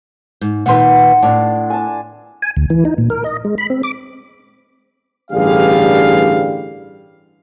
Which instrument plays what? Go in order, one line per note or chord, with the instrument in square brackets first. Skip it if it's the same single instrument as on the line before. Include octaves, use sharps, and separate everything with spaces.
[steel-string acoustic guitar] G#2
[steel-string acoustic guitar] A#2 D#3 B4 [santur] F#5 C6
[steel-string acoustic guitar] A2 [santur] D4
[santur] G#5 A5
[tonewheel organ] G#5
D2
E3
D#4
A#2
A#4
D#5
G#3
B5
C4
D6
[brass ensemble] A1 G2 D3 G3 G#4 F5